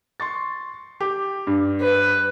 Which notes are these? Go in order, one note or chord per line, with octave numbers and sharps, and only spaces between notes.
C6 C#6 A6
G4
G2
B4